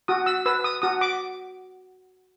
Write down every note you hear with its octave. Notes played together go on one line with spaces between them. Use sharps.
F#4 D#6
E6
B4 E6
D#6
F#4 D#6
D6